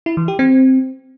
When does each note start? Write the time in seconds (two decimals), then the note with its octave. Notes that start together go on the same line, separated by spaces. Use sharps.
0.06 E4
0.17 E3
0.28 G4
0.39 C4